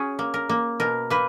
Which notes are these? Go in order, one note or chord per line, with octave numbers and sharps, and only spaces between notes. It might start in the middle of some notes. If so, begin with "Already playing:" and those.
Already playing: C#4 F#4 G#4
A#3
A#4
A#3
B2 A#4
A#3 B4